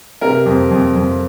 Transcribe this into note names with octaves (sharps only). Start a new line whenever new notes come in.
C3 A#4
F2
F2
F2